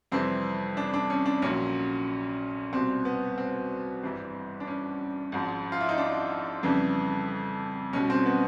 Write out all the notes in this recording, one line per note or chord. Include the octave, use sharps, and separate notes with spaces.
F2 C3 E3 G3 C4
D4
D4
C#4
D4
A#1 A#2 F#3 C#4
C2 B2 G3 C4
B3
C4
G#1 G2 E3 G3
D4
C#4
G#1 G#2 F3
F4
E4
D#4
D4
F2 C#3 E3 G3
B1 B2 G3 C#4
C4
B3